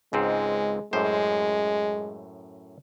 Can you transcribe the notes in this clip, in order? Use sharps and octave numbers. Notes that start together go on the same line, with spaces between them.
C#2 G#2 G#3 C4
F#2 A2 G#3 C5